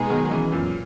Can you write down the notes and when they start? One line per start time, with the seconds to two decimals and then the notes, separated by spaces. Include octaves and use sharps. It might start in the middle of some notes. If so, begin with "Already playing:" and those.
Already playing: B2 G#3 B3 D#4 G#4
0.10 D#3 F#3
0.31 C#3 E3
0.52 F#2 A#2